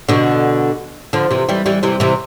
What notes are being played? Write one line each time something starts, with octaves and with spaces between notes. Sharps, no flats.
B2 D3
D3 F3
C3 E3
E3 G3
E3 G3
C3 E3
C3 E3